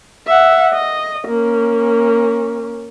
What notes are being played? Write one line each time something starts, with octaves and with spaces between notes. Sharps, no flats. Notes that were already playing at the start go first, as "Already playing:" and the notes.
E5 F#5
D#5
A#3 C#4